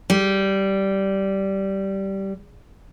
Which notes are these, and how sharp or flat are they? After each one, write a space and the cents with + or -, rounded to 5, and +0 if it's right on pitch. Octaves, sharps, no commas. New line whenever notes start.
G3 -10